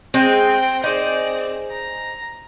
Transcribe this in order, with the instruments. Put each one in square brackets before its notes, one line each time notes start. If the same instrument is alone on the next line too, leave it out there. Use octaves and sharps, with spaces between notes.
[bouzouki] G#3 [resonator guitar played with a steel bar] C4 [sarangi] G5
[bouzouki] D#4 G#4 C5 [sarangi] D5
[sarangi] A#5